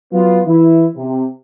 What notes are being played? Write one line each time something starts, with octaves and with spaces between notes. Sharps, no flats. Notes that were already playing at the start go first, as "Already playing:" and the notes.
F#3 B3 F4
E3 E4
C3